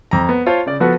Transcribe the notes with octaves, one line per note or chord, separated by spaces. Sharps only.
F2 A#5
B3
F4 C5 C#5 A5
C#3 D5
F3 B3 F#4 A4 B4